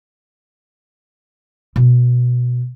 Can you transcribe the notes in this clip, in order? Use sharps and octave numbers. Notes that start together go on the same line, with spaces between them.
B2 B3